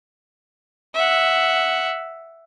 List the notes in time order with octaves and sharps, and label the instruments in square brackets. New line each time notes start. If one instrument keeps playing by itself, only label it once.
[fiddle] E5 F#5